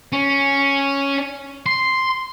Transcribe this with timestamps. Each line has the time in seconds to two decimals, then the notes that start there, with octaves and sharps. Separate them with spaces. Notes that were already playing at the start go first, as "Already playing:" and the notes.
0.13 C#4
1.66 C6